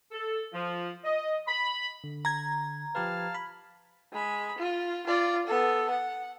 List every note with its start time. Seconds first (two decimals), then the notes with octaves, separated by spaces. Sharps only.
0.12 A4
0.53 F3
1.04 D#5
1.47 B5
2.04 D3
2.25 A#5 G#6
2.95 F3 G4 B4 F5 A5
3.35 B5
4.13 G#3 B5
4.58 F4
5.07 F4 D5
5.47 B3 A4
5.90 F#5